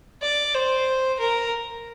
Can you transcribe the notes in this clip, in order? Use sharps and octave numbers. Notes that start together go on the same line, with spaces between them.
D5
C5
A#4